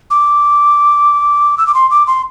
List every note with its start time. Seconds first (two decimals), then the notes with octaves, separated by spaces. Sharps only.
0.10 D6
1.58 E6
1.67 D6
1.74 C6
1.91 D6
2.07 C6